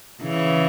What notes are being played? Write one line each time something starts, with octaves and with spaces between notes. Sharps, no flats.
C#3 E3